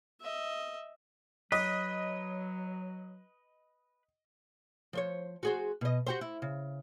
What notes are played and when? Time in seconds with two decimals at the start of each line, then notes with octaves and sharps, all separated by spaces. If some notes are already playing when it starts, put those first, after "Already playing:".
0.21 D#5 E5
1.52 F#3 B4 D#5
4.93 F3 C5 C#5
5.43 F#4 G#4 C5
5.81 B2 D#5
6.07 F#4 G4 C5
6.21 E4
6.42 C#3